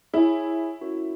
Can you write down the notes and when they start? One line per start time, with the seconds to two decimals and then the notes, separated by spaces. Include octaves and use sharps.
0.13 E4 G#4 C#5 G#5
0.81 C#4 F#4 A#4 C#5